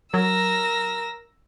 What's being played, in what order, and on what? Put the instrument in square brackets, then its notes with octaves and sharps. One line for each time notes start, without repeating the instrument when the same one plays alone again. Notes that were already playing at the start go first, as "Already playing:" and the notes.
[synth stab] F#3 [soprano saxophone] A#4 [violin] E6 A#6